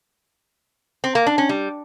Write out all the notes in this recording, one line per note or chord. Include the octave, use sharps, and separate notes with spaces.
C4
A#3
D4
C#4
G3